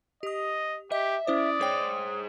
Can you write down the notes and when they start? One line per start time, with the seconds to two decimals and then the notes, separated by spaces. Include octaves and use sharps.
0.23 G4 D#5 D#6
0.92 G4 D#5 E5
1.27 C#4 E4 C5 D5 D#6
1.61 G#4 C5 C#5 G5